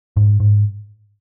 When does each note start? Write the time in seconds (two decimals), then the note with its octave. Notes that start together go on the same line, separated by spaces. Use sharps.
0.17 G#2
0.40 G#2